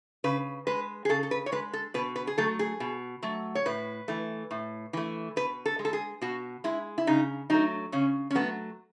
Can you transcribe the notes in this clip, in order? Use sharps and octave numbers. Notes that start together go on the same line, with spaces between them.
C#3 B4
G#3 B4
G#4
C#3 A4
A4
B4
C#5
G#3 B4
A4
B2 B4
B4
G#4
F#3 A3 A4
G#4
B2
F#3 A3
C#5
A2 B4
E3 A3
A2
E3 A3
B2 B4
A4
G#3
A4
G#4
B2 F#4
G#3 E4
E4
C#3 D#4
F#3 A3 D#4
C#3 C#4
C#4
F#3 A3 B3